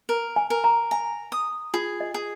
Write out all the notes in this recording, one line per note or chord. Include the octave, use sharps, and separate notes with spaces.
A#4
G#5
A#4
A#5
G#5 A#5
D#6
F4 G#4
D#5
G#4